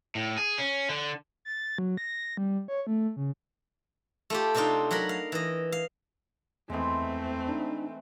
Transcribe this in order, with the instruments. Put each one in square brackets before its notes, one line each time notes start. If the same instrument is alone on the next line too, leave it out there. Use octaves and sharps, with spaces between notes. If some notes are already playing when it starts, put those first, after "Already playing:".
[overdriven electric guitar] A2
G#4
C#4
D3
[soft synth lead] A6
F#3
A#6
G3
C#5
A3
C#3
[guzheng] A3 F4 G4
C3 C4 D4 D#4 F4
F#3 F#4 A#4 B5
F5
E3 D#5
F5
[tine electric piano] E2 [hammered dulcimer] E3 G#3 [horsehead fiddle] A3 C4
[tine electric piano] D4 D#4